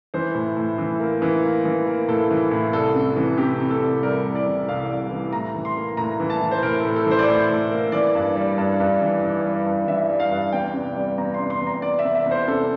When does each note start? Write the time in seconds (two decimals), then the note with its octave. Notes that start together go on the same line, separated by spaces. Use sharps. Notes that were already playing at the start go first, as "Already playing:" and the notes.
0.14 E3 C5
0.35 A2
0.57 A2
0.78 E3
1.00 A#3
1.22 E3
1.44 A#3
1.65 E3
1.87 A#3
2.08 A2 A4
2.31 E3
2.51 A2
2.73 C2 A4
2.95 C3
3.16 E3
3.38 C3 G4
3.60 C3
3.70 A4
3.82 C2
4.03 G3 A#4
4.24 C2
4.35 D5
4.46 E3
4.69 C2 F5
4.89 G3
5.11 E3
5.33 A2 A#5
5.55 E3
5.65 C6
5.77 A#3
5.97 A2 A#5
6.20 E3
6.30 A5
6.41 E3
6.51 C5
6.63 A2 A#4
6.79 A4
6.85 A2
6.96 A4
7.06 E3 C5
7.19 D5
7.25 A2 C5
7.50 A2
7.71 A#3
7.92 E3 D5
8.15 G2
8.36 G3
8.58 G2
8.80 G2
9.01 E3
9.23 E3
9.44 G3
9.66 G2
9.87 E3 E5
10.10 G3
10.20 F5
10.31 G2
10.52 E2 G5
10.74 C3
10.95 G3
11.18 E2 A#5
11.34 C3 C6
11.50 C6
11.61 E2
11.67 A#5
11.82 E2 D5
11.99 E5
12.04 E2
12.15 E5
12.26 E2
12.31 C5
12.48 C3 A4